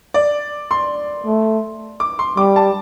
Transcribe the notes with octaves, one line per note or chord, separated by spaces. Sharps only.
D5
C6
A3
D6
C6
G3 D6
A5